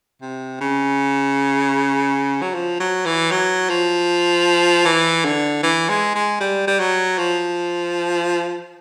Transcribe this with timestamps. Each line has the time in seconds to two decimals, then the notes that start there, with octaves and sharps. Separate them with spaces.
0.22 C3
0.61 C#3
2.42 F#3
2.54 F3
2.80 F#3
3.06 E3
3.31 F#3
3.69 F3
4.85 E3
5.25 D3
5.63 E3
5.89 G#3
6.15 G#3
6.40 G3
6.67 G3
6.79 F#3
7.18 F3